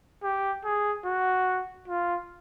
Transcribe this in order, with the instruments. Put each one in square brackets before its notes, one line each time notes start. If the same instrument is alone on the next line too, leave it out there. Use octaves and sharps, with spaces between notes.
[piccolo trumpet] G4
G#4
F#4
F4